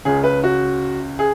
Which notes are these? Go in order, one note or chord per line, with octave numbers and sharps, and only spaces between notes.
C#2 C#3 G#4
B4
F#4
G#4